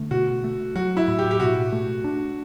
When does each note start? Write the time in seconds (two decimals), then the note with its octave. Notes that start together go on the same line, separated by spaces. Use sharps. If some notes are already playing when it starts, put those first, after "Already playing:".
Already playing: D3 A3
0.11 B2 F#4
0.44 A3
0.76 F#3 F#4
0.97 E4
1.08 A2
1.19 G4
1.31 G4
1.40 B2 F#4
1.72 A3
2.04 D4